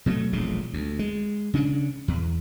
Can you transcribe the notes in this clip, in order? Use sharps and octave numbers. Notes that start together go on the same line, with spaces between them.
B2 F#3 G#3 A3
E1 A#1 A2 G#3
D2
G#3
C#3 C#4 D4
E2